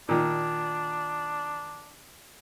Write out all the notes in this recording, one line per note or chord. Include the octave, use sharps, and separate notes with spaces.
A#2 D#3 D4